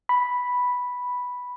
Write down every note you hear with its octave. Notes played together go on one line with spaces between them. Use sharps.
B5